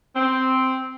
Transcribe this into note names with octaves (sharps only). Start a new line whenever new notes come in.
C4